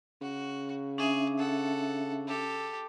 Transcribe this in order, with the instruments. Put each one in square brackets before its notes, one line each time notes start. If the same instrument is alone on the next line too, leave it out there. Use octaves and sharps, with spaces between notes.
[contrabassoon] C#3 [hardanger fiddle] F#4
[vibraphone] C#4 D4 E5 [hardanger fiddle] G#4
[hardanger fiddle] A4 F#5
G4 A4